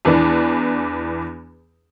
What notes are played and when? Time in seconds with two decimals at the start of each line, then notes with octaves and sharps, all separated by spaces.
0.05 E2 E3 B3 D4